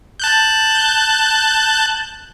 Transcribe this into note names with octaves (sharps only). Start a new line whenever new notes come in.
A5 F#6 G6